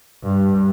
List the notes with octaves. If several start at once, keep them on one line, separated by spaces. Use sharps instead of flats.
G2